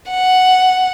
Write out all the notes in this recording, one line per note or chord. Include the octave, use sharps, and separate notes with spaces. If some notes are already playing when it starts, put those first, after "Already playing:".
F#5